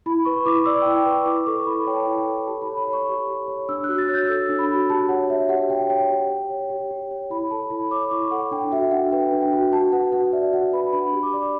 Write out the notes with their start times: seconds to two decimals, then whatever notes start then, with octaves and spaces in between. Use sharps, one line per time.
0.06 E4 B5
0.25 B4 C#6
0.46 E4 D6
0.65 D5 E6
0.82 E4 G5
0.96 G5
1.06 B4
1.11 C#6
1.26 E4 D6
1.47 A4 C#6
1.66 E4 B5
1.87 C#5 G5
1.95 A5
2.03 G5
2.07 E4
2.12 A5
2.19 G5
2.27 A4
2.47 G4 A5
2.62 B5
2.67 C#5
2.77 B5
2.88 C#5
2.93 C#6
3.08 G4
3.27 G4
3.48 C#5
3.69 D4 E6
3.84 F#6
3.89 F#4
3.98 A6
4.08 C#5 F#6
4.14 G6
4.28 A4 E6
4.49 D4
4.59 B5
4.69 F#4
4.90 G4 A5
5.09 C#5 F#5
5.30 C#5 E5
5.49 G4 F#5
5.69 G4 G5
5.89 C#5 G5
6.09 G4
6.30 C#5
6.50 C#5
6.70 G4
6.91 G4
7.11 C#5
7.30 E4 B5
7.51 A4 A5
7.70 E4 B5
7.91 C#5 D6
8.11 E4 C#6
8.31 A4 F#5
8.51 D4 G5
8.72 F#4 E5
8.91 D4 F#5
9.12 B4 G5
9.32 D4
9.42 G5
9.53 F#4
9.72 F#4 A5
9.92 B4 F#5
10.12 F#4 F#5
10.33 D5 E5
10.53 F#4 F#5
10.73 B4 B5
10.93 D4 B5
11.13 G4
11.23 D6
11.33 D5